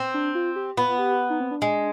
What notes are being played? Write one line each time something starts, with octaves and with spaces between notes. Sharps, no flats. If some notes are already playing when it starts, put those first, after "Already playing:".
Already playing: C4
D4
F4
G4
B3 F4
G4
D#4
C4
D4
G#3